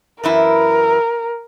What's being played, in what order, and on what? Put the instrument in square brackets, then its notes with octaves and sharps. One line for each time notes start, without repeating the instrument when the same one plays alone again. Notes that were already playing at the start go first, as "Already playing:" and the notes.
[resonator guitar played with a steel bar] F#2 E3 E4 [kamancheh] A#4